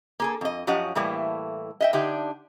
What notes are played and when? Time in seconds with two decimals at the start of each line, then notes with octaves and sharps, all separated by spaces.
0.20 A#3 G#4 A4
0.41 F2 D#5
0.67 F#2 F3 C#4 G4 D#5 F#5
0.95 A2 E3 G3 A3 A#3
1.80 D#5 E5 G5
1.93 D3 D4 D#4 G4